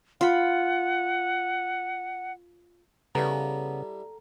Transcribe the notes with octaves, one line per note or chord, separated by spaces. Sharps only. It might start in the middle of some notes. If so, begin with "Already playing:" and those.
F4 F#5 B5
C#3 G3 B3 E4 A4 A#5